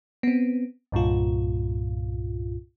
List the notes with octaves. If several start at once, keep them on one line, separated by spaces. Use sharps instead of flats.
B3 C4
C2 G2 A#2 F4